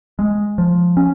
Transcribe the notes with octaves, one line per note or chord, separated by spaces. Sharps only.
G#3
F3
C#4